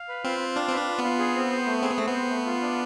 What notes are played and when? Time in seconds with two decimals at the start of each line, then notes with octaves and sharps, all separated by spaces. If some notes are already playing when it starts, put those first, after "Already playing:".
Already playing: F5
0.09 B4
0.24 C4 F4
0.40 F4
0.56 D4 F5
0.69 C4 B4
0.77 D4
0.88 F4
0.98 B3
1.04 F4
1.19 G#4
1.35 C4
1.51 C5
1.66 A3
1.83 C4 G#4
1.90 B3
1.98 A3 C4
2.06 B3
2.14 C5
2.30 A3
2.46 F4
2.62 D4